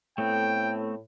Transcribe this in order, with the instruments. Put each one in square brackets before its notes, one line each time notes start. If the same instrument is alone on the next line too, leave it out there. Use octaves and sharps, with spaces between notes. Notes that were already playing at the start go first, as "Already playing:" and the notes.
[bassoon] A2 [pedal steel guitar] A3 B3 C4 [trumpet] G5